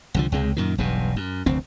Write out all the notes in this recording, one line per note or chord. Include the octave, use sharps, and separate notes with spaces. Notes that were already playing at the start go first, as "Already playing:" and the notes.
C2 D3 F3
C#2 C3 G#3
F#2 A#2 D#3
E1 B1 G2 B2
F#2
F1 D2 C4